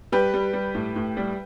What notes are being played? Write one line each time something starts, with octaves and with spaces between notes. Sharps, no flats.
G3 G4 B4
G3
G3
A2
A2
G3